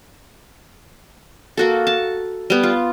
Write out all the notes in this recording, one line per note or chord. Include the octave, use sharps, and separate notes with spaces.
A#3 F#4 A4
A5
G3 B3
F4